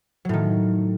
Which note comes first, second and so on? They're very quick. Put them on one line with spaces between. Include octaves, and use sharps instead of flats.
F#3 A2 D#3